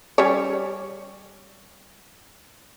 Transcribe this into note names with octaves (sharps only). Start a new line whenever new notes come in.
G3 C#4 C#5